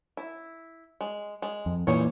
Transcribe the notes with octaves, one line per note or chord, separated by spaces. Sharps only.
E4
G#3
G#3
F2
A#2 E3 G3 G#4 C#5